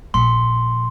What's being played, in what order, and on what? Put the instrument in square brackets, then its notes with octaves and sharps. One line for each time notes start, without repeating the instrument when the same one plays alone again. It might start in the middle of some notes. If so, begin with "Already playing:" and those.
[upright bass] A#1 [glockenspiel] C6